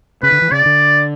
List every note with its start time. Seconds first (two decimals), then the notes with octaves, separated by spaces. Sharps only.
0.23 C#3 B4
0.32 D3
0.42 E3
0.51 C#3 D5
0.66 D3